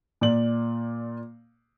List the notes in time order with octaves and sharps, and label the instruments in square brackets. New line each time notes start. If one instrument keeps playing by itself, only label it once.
[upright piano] A#2 D5 F#7